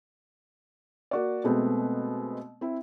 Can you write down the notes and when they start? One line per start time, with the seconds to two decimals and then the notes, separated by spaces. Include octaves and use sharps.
1.11 A#3 F#4 D5
1.44 B2 G#3 A3 B3 C4
2.61 C4 E4